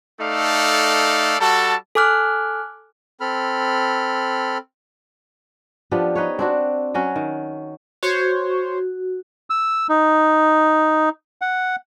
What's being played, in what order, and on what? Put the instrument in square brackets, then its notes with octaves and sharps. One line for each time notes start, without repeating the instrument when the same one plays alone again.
[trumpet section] A3 D#4 A4 D5 F5
G3 F#4 A4 A5
[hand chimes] A4 G#5 D6 F6 F#6
[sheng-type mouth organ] C4 A4 B5 F6
[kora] F3 B3 D4 G4
D#4 B4 C#5
C4 D4 F#4
F#3 C#4 F#4
D#3
[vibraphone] F#4 [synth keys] C5 C#5
[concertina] E6
D#4
F#5